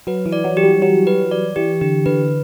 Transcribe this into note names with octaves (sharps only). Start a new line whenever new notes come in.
F#3 B4
E3
D5
F#3
G4
G3
F#3 G4
B4
D5
E3 G4
D3 G4
D3 B4